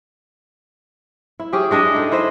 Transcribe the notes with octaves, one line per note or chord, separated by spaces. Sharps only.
E4
C#4 G4 G#4
G#3 D4 D#5 E5
D#4 A4
E4 C5 D#5 E5